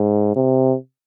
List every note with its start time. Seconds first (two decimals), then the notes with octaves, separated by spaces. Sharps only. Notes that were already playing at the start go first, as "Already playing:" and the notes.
Already playing: G#2
0.36 C3